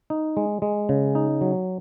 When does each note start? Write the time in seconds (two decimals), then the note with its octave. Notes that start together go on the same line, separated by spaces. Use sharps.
0.10 D#4
0.37 G#3
0.62 G#3
0.89 C#3
1.15 D#4
1.41 F#3